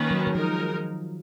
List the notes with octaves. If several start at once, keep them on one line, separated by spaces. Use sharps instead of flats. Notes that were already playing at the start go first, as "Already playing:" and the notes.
Already playing: D#3 A#3 C#4 B4
F#3
D#3
F3 G#3 D#4 A#4